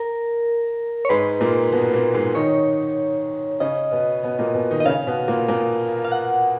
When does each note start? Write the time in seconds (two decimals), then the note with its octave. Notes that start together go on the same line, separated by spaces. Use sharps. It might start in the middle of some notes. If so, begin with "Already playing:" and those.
Already playing: A#4
1.05 C#5
1.09 G#2 G#3 B4
1.41 A#2 A#3
1.72 B2 B3
1.93 A#2 A#3
2.14 G#2 G#3
2.35 D#3 D#4 C#5
3.60 C#3 C#4 D#5
3.92 B2 B3
4.23 B2 B3
4.39 A#2 A#3
4.54 B2 B3
4.71 D#3 D#4
4.80 D#5
4.86 C#3 C#4 F5
5.07 B2 B3
5.28 A#2 A#3
5.48 A#2 A#3
6.05 F5
6.12 F#5